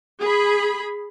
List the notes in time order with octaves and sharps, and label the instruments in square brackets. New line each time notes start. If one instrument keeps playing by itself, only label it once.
[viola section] G#4 B5